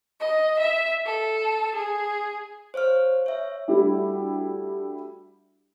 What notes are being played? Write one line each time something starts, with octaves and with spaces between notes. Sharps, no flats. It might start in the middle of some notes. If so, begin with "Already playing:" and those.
D#5
E5
A4
G#4
C5 C#5 F5 F6
C#5 E5
G3 A3 D4 E4 F#4 G4